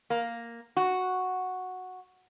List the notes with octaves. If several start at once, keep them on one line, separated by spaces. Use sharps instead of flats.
A#3
F#4